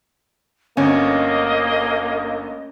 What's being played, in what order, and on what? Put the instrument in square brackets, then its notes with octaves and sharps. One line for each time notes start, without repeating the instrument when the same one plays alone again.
[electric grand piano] G1 D2 D3 [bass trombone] A#3 [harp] C#4 [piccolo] D#5